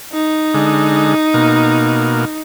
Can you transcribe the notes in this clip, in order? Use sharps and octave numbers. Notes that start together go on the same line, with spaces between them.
D#4
D3 G#3
B2 A#3